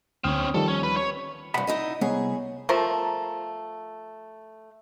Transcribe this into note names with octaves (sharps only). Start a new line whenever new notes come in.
D2 C4 C#4 D#6 F6
D#3 F3 G3 A4
C#4
B4
C#5
G2 C3 E5 F#5 B5
D#4 E4 D#5
C2 B3 G#4 C#5
F3 A3 A#4 C5